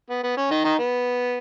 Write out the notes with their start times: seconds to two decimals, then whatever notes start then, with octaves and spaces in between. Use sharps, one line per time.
0.10 B3
0.24 B3
0.37 C#4
0.51 D#3 D#4
0.64 D#3 D#4
0.79 B3